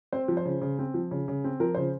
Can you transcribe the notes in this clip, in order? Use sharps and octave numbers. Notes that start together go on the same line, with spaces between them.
C4 C5
F3
C5
C#3
C#3
C4
F3
C#3
C#3
C4
F3 A#4
C#3 C5